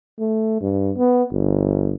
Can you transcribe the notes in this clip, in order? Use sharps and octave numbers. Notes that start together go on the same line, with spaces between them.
A3
G2
B3
G1